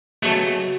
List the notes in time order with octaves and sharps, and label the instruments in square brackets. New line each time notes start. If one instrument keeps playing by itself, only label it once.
[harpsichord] C#3 F#3 B3 D#4 [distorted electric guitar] A3